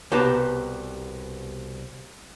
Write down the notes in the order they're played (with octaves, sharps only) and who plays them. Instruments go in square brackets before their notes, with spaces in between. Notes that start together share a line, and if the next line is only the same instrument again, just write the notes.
[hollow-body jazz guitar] C2 B2 G4 B4 A5 A#5